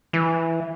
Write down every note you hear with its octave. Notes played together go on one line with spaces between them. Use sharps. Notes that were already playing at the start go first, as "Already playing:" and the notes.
E3